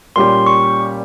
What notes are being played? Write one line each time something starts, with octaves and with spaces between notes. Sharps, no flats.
A#2 G3 C#4 G4 C6
C#6